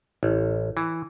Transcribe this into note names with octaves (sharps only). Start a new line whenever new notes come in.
A1
E3